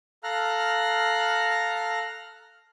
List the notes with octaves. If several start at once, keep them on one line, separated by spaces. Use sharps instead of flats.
A4 F5 A#5 F6 F#6